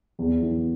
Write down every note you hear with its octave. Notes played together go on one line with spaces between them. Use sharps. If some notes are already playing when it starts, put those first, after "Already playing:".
E2
E3